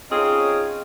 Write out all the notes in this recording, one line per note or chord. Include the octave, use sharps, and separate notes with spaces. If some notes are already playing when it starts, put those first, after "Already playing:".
C4 C#4 D#4 F4 G#4